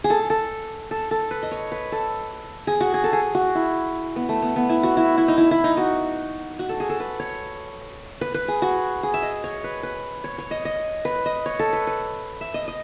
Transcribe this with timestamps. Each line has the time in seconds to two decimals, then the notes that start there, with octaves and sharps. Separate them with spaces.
0.04 G#4
0.10 A4
0.30 A4
0.91 A4
1.11 A4
1.31 B4
1.43 D#5
1.51 C#5
1.72 B4
1.92 A4
2.67 G#4
2.81 F#4
2.94 G#4
3.04 A4
3.13 G#4
3.35 F#4
3.55 E4
4.16 B3
4.29 A3
4.42 B3
4.56 B3
4.69 E4
4.83 F#4
4.97 E4
5.18 E4
5.28 D#4
5.38 E4
5.51 E4
5.64 D#4
5.77 F#4
6.59 F#4
6.69 A4
6.80 G#4
6.90 A4
7.00 B4
7.20 C#5
8.21 B4
8.34 B4
8.48 G#4
8.62 F#4
9.03 G#4
9.14 E5
9.22 D#5
9.44 C#5
9.64 B4
9.83 B4
10.24 C#5
10.38 C#5
10.51 D#5
10.65 D#5
11.05 B4
11.26 D#5
11.46 C#5
11.59 A4
11.73 B4
11.87 B4
12.41 E5
12.54 D#5
12.68 D#5